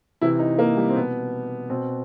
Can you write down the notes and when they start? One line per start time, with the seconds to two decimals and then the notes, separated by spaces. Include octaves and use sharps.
0.21 C3 E3 E4
0.39 D#4
0.59 A#3
0.77 G3
0.89 C4
0.96 B2 B3
1.70 B2 C4